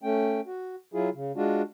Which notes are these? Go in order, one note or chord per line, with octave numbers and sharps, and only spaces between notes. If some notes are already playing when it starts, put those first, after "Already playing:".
A3 C#4 G5
F#4
F#3 E4 F4 G#4
C#3
G#3 D4 F4 F#4